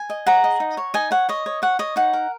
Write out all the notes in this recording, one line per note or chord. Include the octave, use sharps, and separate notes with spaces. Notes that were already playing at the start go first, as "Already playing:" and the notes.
Already playing: G#5
D#5
G#4 F#5 A#5
D#5
D#4
C#5
D#4 D#5 G#5
C#5 F#5
C#5 D#5
C#5
C#5 F#5
C#5 D#5
D#4 F#5
A#4